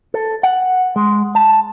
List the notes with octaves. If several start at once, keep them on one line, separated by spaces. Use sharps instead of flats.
A4
F#5
G#3
A5